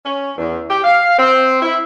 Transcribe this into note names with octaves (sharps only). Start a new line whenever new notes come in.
C#4
E2
G4
F5
C4
E4